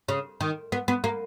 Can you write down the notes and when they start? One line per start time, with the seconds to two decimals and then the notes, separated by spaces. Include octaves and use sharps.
0.08 C#3
0.41 D#3
0.72 B3
0.88 B3
1.04 A#3